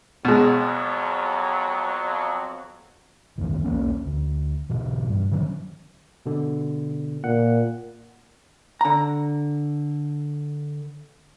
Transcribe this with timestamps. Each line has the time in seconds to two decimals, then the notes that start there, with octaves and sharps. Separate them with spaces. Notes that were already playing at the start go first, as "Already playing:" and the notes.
0.25 F2 B2 F#3 G#3
3.38 C2 F2 D#3 E3
3.64 B1 E2 A#3 C#4
4.06 D2
4.70 G#2 B2 E3
5.09 G2
5.31 D3 D#3 F#3 C#4
6.26 B2 D3
7.24 A#2 F#5
8.81 D3 A#5